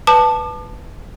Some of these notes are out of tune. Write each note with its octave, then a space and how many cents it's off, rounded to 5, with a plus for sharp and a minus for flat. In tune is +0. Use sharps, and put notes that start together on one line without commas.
B4 +0 A5 +0 D6 +40